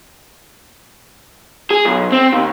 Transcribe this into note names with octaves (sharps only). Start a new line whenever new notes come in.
G#4
B1
C4
D#2